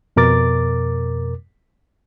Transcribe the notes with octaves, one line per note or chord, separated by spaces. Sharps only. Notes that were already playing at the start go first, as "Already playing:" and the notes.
F2 B2 A#4 D6 A6